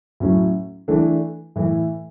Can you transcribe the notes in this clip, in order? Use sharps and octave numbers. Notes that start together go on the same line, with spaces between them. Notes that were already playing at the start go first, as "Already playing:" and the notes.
A2 F#3 C#4
E3 A3 D4
A2 E3